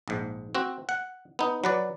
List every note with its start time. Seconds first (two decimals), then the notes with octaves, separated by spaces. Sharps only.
0.08 A#1 G#2
0.55 C4 F#4
0.89 F#5
1.39 B3 D#4
1.64 F#3 B4 D5